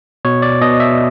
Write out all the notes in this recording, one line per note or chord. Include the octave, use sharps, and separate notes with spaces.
B2 C#5
D5
B2 D#5
E5